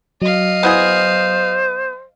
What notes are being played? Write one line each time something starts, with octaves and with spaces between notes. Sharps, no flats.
F#3 D#5 F5
B3 E4 G#4 C5